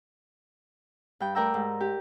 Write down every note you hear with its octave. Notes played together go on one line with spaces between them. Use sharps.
G2 G5
A3 A#4 D5 G5 A#5 E6
G#2
G4